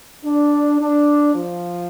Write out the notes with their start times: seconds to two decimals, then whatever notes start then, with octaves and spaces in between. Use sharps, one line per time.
0.25 D4
0.80 D4
1.34 F3